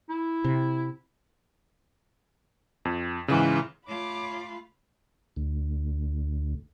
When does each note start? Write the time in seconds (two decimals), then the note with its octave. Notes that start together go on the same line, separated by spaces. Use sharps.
0.09 E4
0.44 C3
2.85 F2
3.28 G#2 C#3 E3
3.88 A3 F4 C#5 B5 D6
5.36 D2